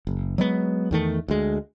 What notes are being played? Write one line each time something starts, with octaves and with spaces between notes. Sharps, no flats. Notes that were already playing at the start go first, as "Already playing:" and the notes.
F#1
F#3 G#3 B3
E2 D#3 A3
D2 G#3